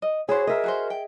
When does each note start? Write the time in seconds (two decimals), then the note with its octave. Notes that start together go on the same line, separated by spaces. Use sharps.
0.02 D#5
0.29 E4 F#4 G#4 C5 C#5
0.47 A#4 D#5 E5
0.64 F#4 G#4 C5
0.90 G5